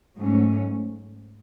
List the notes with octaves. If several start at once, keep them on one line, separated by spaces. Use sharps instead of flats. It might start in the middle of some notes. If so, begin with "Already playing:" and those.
G#2 F#3 A3 C#4